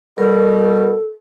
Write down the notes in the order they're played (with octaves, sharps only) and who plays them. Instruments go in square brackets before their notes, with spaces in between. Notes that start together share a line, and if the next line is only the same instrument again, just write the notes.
[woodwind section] B2 G3 [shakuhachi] A4 [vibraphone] A#4